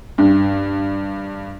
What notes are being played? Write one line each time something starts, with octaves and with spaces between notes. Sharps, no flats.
G2